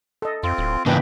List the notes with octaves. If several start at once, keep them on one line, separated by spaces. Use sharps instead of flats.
A4 D#5
F2 C4 F4
D1
G#2 C#3 E3 A#3 D4 B4 D#5 G5